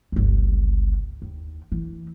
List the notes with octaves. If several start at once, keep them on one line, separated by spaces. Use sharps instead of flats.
G1 C#2
D#2
E3